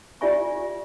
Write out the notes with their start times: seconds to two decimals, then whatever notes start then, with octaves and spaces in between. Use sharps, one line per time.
0.21 F4 G4 D5 E5 G#5 C#6